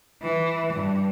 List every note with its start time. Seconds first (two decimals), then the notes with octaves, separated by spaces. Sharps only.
0.22 E3
0.72 G2